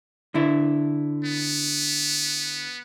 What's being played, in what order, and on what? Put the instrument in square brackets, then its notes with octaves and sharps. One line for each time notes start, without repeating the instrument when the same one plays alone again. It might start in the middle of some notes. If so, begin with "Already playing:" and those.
[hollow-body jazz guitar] D3 E4
[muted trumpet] B3